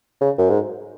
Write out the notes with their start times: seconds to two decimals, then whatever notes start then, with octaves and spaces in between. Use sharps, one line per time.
0.21 C#3
0.38 F#2
0.50 G#2